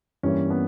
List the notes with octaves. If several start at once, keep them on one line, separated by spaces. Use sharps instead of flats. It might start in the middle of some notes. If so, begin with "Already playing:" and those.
G2 E3 G3 A#3 C#4
B3